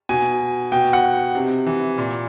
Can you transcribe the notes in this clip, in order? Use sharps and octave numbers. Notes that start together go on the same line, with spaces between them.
B2 G#5
B2 G5
F#5
C3
E3
A#2